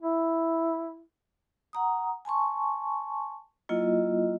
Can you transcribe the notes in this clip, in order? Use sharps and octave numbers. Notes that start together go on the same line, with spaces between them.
E4
F#5 A#5 D#6
G#5 A5 C6 C#6
F#3 A#3 E4 F4 D#5